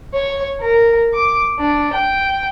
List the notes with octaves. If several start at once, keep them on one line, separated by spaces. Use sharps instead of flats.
C#5
A#4
D6
D4
G5